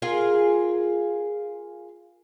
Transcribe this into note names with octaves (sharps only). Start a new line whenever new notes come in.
F4 G#4 A#4 F5